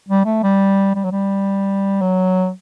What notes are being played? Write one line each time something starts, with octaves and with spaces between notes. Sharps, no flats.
G3
A3
G3
G3
F#3
G3
F#3